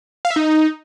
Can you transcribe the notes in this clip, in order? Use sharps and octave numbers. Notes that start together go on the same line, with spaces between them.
F5
E5
D#4